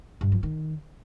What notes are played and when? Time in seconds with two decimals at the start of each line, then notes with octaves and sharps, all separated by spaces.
0.21 G2
0.32 F3
0.43 D#3